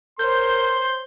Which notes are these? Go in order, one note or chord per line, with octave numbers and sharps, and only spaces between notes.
A#4 C5 C#5 C6 G6